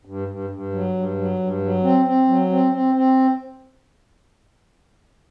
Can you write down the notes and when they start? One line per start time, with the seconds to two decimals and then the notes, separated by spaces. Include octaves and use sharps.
0.05 G2
0.28 G2
0.50 G2
0.72 F#3
0.95 G2
1.16 F#3
1.39 G2
1.61 F#3
1.83 C4
2.05 C4
2.28 F#3
2.50 C4
2.72 C4
2.94 C4